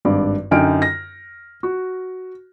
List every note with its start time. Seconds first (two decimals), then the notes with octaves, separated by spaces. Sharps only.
0.05 G#1 G2 D5
0.51 F#2 D3 D#4 G5 F6 D7
0.82 A#6
1.63 F#4